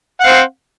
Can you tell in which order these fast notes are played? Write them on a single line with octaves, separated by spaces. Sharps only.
F#5 F5 C4